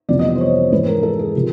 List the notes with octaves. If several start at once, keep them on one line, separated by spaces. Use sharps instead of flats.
F2 C3 E3 G3 B3 D5
D#5
D#5
C5
C#5
G#2 E3 G#3 B4
A#4
A4
G#4
C3 F3 G#3